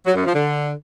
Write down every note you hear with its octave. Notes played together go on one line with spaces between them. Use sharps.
F#3
F#2
F3
D3